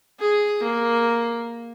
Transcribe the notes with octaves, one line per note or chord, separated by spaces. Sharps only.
G#4
A#3